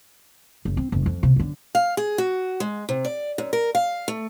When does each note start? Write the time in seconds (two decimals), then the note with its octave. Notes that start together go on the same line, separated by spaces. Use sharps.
0.65 F#1
0.77 C4
0.92 F#1 G2
1.06 F2
1.23 C3
1.36 F#2 D3
1.75 F5
1.97 G#4
2.18 F#4
2.60 G#3
2.89 C3
3.05 D5
3.38 F#2
3.53 A#4
3.75 F5
4.08 A3